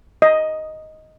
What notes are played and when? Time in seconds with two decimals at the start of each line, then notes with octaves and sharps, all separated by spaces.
0.22 D#5